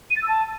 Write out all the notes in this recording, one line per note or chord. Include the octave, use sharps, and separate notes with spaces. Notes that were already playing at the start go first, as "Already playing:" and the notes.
D#7
A6
E6
A5